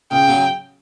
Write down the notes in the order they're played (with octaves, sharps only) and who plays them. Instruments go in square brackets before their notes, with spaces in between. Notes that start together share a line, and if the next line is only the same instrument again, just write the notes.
[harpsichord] C#2 [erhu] G5
[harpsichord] C#3 F#3